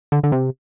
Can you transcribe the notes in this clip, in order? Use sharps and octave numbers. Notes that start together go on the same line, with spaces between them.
D3
D3
C3